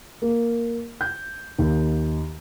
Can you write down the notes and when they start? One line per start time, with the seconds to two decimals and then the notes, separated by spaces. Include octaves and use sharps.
0.22 A#3
1.01 G6
1.59 D#2